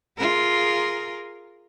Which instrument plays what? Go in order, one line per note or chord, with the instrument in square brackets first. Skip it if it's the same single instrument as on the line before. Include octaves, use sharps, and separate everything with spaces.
[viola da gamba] F4 G#4 A#4